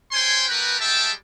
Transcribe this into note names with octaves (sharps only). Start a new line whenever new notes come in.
C#4 C5 C#5 G5 G#5 C6
A3 F#4 G4 A#4 B4
G3 G#3 E5 G5 A5